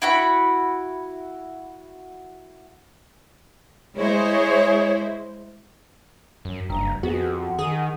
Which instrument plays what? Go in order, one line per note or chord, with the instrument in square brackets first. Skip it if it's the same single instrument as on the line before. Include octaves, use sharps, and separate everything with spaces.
[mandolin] E4 F#4 B5
[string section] G#3 E4 C5 [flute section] G#4 C#5
[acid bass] F#2
[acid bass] F#1 [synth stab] G2 [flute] A#5
[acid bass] F2 [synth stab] B3 F#4 [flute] G#4
[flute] F#5
[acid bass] D#3 [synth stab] G#4 D#6